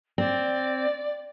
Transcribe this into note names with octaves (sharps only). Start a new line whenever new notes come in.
C4 D5